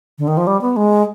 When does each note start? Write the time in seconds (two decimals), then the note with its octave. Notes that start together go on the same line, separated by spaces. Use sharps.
0.18 D3
0.28 D#3
0.37 F3
0.47 G3
0.61 B3
0.76 G#3